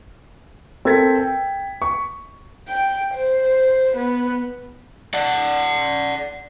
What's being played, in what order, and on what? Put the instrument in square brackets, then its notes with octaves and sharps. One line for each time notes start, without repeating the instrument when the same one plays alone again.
[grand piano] C4 A4 A#4 G#6 A6 B6
G5
C#6
[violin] G5
C5
B3
[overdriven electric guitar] D5 F#5